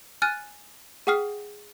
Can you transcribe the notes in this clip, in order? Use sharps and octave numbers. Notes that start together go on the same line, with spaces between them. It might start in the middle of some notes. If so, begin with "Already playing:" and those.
G#5 F6 F#6 A6 D#7
G#4 F#5 G5 D#6 F6 C7